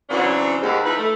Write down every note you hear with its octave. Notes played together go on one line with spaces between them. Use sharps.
C#3 E3 F#3 C4 D4 F#4
D#2 G#2
F3 D#4 E4 B4
A3